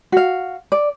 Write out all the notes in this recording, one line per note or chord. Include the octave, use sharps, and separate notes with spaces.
F#4 F5
D5